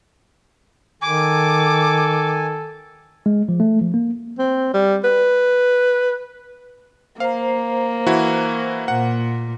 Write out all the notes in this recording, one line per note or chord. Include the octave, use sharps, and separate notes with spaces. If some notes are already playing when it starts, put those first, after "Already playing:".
D#3 A4 G#5 D6
G#3
F3
A3
F3
A#3
C4
G3
B4
A#3 C5 F5 A#5
E3 E4 F#4
A#2 F#5